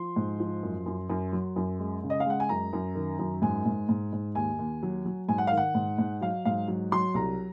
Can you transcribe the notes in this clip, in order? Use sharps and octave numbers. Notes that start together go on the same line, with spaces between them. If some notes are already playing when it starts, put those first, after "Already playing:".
Already playing: F3 C6
G#2
F3
F#2
F#2
F#2
F#3
F#2
G#3
C#3
D#5
F5
G#3 F#5
G#5
F#2 A#5
F#2
D#3
F#2
G#2 G#5
G#2
G#2
G#2
D#2 G#5
D#2
F#3
F#3
G#2 G#5
F#5
D#3 F5
F#5
G#2
G#2
F#3 F5
G#2 F5
F#3
F#3 C6
C2 A#5